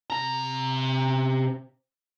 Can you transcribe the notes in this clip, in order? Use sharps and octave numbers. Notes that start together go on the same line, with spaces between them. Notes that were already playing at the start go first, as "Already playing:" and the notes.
C3 A#5